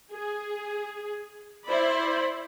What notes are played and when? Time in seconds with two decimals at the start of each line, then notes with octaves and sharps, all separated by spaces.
0.12 G#4
1.66 E4 C5 D5 B5